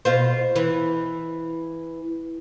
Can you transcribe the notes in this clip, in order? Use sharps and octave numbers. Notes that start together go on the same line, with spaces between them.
B2 F4 C5
E3